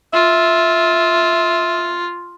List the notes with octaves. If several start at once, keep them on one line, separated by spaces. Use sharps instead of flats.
F4 E5